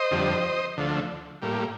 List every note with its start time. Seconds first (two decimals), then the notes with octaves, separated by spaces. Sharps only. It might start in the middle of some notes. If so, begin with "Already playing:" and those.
Already playing: C5 D#5
0.11 F2 D3 G3
0.77 D2 D3 F3 A3
1.42 A2 G3 A#3